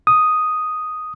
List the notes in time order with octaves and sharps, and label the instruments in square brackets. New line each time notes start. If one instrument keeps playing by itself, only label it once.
[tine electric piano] D#6